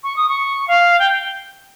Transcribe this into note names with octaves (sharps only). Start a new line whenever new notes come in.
C#6
D#6
C#6
F5
G5